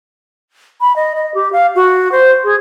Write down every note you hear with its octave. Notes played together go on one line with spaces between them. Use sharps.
B5
D#5
D#5
G4
F5
F#4
C5
G#4